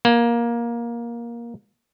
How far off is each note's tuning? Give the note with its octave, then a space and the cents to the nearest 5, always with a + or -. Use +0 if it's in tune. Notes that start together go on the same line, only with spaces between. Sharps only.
A#3 +15